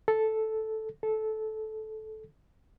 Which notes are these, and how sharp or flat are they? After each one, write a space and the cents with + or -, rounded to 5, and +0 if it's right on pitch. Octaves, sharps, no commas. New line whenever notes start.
A4 -5
A4 -15